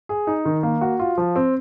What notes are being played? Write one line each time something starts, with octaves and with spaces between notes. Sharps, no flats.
G#4
D#4
D#3
A#3
F#4
F4
F3
C4